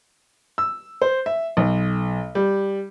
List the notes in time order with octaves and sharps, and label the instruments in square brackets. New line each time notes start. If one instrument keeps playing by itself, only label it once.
[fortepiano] E6
C5
E5
B1
G3